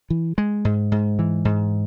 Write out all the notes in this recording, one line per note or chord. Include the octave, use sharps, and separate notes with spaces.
E3
G#3
G#2
G#2
E3
G#2